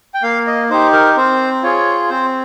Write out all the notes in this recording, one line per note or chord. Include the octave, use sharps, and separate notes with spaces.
G5
A#3 F5
D#5
D#4 G4 C5
A#4
C4 C5
F4 G#4 C#5
C4 C5